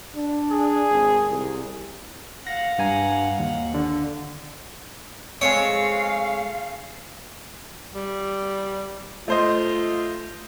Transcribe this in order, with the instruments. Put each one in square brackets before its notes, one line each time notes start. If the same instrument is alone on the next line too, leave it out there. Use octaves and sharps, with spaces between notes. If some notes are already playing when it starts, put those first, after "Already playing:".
[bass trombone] D4
[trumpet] G#4
[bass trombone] G#1
C2
[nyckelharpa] F5 F#5 [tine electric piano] A#6
[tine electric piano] G2 G#5 A#5
D#2
D3
[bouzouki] G#3 A3 C4 [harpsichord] C#5 [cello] F5
[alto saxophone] G3
[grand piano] A3 C5 D#5 [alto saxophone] F4